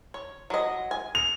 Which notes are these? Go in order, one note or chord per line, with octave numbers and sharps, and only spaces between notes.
C#5
F#3 D#5
G#5
F7